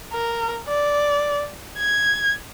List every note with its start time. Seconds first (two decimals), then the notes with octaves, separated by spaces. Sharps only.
0.13 A#4
0.68 D5
1.78 G#6